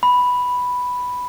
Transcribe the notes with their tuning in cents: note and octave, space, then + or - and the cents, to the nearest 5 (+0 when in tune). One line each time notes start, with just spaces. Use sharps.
B5 +0